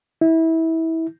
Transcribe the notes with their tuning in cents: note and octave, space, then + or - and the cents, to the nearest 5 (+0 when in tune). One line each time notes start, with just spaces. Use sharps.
E4 -25